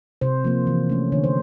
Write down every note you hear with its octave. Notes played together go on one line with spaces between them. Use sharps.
C3 C5
F3 A#3
E3
A3 C#4
D3 C#5
C5